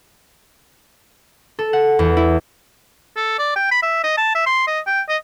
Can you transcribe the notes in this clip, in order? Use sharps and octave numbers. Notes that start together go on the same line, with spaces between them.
A4
F#5
E2
E4
A4
D5
G5
B5
E5
D#5
A5
E5
C6
D#5
G5
D#5